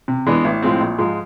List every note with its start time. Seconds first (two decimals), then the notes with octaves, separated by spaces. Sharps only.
0.08 C3
0.27 E3 G#3 B3 D4
0.44 A1
0.62 A2 F3 G#3 C4
0.81 A#1
0.98 G#2 F3 G#3